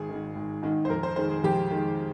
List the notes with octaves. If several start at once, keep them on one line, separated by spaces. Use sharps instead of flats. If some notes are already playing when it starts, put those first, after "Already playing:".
Already playing: G#1 G#4
G#2 D#3
G#1
G#2 D#3
C5
F2 A#4
C5
D#3 G#3 C5
G#4
F2 G4
D#3 G#3